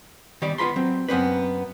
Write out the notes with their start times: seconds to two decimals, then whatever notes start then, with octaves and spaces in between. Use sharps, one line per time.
0.42 D#3 G3 B3 D5
0.58 B3 F4 B5 C6
0.76 F#3 C4
1.08 F#2 B3 C4 B4